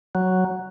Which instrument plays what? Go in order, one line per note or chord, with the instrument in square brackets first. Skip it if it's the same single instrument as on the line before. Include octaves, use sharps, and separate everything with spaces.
[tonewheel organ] F#3